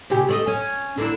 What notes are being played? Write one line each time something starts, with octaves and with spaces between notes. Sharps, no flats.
A#2 C#3 G4
A3 D5 D#5
C#4
D3 A#3 E4